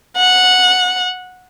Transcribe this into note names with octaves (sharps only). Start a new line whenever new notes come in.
F#5